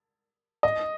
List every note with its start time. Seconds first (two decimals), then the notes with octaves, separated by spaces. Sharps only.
0.63 D#5